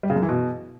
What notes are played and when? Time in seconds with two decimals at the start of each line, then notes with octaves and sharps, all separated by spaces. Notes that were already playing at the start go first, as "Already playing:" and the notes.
0.03 G3
0.10 C#3
0.16 F#2
0.22 E3
0.29 B2